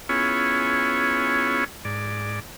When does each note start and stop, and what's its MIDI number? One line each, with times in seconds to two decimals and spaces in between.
0.09 1.64 59
0.09 1.64 61
0.09 1.64 64
0.09 1.64 65
0.09 1.64 68
0.09 1.64 73
1.85 2.40 44
1.85 2.40 74